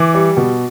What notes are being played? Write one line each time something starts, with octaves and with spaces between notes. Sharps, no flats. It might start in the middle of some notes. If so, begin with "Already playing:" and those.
Already playing: E3 D6
G3
B2